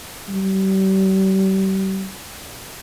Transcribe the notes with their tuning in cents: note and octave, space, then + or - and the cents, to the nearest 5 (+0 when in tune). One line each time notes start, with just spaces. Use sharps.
G3 -35